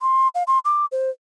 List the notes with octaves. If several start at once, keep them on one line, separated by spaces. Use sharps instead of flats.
C6
F5
C6
D6
C5